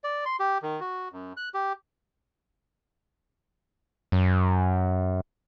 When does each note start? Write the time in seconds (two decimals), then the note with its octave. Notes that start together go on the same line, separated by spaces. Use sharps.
0.04 D5
0.26 C6
0.40 G4
0.62 D#3
0.80 F#4
1.12 F#2
1.37 F#6
1.54 G4
4.12 F#2